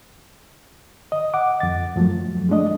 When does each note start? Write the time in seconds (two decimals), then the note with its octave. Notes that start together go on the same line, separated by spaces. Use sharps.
1.12 D#5
1.34 F#5 D6
1.60 F2 A6
1.96 F#2 F3 F#3 A3
2.49 G#3 A3 D4 D#5